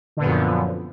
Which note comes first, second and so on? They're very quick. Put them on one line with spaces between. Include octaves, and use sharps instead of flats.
D3 A#2 B3 F#2 F3